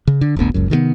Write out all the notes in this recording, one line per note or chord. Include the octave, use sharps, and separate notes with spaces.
C#3
D3
D1 G1 D2 B3
F#1 C#2 F#2
C3 D#3 F3 B3